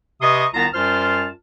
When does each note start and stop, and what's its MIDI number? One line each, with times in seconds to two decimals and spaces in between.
0.22 0.45 48
0.22 0.45 71
0.22 0.45 75
0.22 0.45 84
0.22 0.45 85
0.22 0.45 87
0.54 0.66 36
0.54 0.66 51
0.54 0.66 59
0.54 0.66 65
0.54 0.66 81
0.54 0.66 82
0.74 1.27 42
0.74 1.27 55
0.74 1.27 65
0.74 1.27 72
0.74 1.27 81
0.74 1.27 89